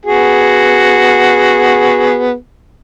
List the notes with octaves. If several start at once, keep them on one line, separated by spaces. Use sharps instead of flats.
B3 F#4 G#4